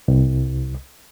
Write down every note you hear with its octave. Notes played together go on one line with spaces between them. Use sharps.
C2